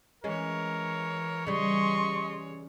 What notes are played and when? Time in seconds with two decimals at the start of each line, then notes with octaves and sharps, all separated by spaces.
0.24 E3 G#3 C#4 A#4 C#5
1.47 C#3 G3 D#5 C6 C#6